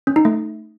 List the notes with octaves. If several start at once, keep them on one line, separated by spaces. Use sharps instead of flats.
C#4
D#4
A3